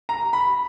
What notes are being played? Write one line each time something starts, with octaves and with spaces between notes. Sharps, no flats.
A#5
B5